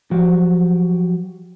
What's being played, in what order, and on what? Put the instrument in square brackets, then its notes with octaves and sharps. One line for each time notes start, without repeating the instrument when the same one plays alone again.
[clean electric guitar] F3 F#3 F#4 G4